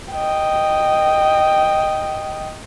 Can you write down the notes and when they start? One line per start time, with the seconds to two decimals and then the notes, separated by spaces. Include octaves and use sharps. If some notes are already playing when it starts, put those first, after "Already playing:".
0.12 D#5 G5